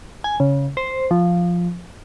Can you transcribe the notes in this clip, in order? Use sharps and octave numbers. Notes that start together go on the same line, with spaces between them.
G#5
C#3
C5
F3